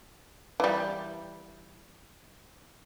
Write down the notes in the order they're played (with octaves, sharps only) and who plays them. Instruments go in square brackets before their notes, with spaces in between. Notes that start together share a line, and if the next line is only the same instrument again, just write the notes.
[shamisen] E3 G3